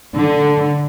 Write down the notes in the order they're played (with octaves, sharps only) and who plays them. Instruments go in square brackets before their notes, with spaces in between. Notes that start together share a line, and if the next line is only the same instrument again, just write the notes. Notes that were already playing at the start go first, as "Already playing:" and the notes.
[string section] D3